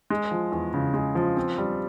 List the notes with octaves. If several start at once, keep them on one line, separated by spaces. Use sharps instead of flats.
G#3
F3
E2
C#3
G#3
F3
C4
G3